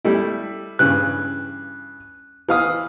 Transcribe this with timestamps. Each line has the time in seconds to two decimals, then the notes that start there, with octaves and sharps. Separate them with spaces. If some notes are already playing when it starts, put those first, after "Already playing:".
0.05 G3 A3 E4
0.79 G2 C#3 E3 F#6
2.48 E3 F5 D#6